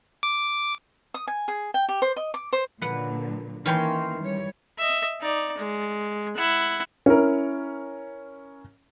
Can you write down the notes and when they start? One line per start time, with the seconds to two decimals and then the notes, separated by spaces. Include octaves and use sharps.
0.23 D6
1.14 D#6
1.27 G#5
1.48 G#4
1.74 G5
1.89 G4
2.02 C5
2.16 D#5
2.34 D6
2.53 C5
2.82 A#2 D3 F#3 B4 F#5 B5
3.66 D#3 E3 A#3 C#4 G5 C6
4.21 G3 C#5
4.78 D#5 E5
5.21 D#4 D5
5.58 G#3
6.35 E4 F#5
7.06 C#4 E4 A#4